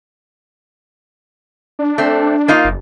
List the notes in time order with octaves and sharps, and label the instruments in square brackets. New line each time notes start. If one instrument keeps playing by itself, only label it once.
[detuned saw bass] D4
[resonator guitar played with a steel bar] A3 C4
A#3 D#4 F4
[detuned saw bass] F#1